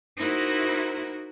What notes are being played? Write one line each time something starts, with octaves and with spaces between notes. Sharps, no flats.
D#4 E4 F#4 A#4 C5